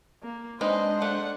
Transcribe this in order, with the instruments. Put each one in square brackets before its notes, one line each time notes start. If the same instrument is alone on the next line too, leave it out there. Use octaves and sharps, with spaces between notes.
[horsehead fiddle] A#3
[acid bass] G#3 [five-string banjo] C4 D#4 B4 [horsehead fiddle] D4 C5 [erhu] D#5
[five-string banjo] A3 A#3 [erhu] F#5